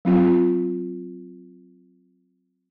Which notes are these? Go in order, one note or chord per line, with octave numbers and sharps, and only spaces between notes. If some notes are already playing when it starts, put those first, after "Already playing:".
F#3 C4 F4